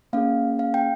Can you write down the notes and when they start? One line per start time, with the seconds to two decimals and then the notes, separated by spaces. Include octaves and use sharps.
0.13 A#3 C#4 G#4 F5
0.59 F5
0.74 G5